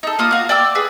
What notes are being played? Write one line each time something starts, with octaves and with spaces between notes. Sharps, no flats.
D#4 A4
A#3 F4 D#6
F#4 F5
D5 G5 D6 E6
G#4 B4